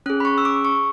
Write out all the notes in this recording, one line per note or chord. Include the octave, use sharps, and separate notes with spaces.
C#4 G#4 F#6
B5
C#6
E6
D6
C#6